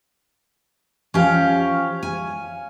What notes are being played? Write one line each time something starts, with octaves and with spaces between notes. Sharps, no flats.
F3 C#4 G4 F5
G#5